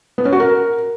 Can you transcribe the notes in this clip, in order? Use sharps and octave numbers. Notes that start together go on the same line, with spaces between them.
B3
C#4
F#4
A#4